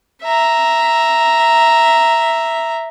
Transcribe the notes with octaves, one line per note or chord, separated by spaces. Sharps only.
E5 A#5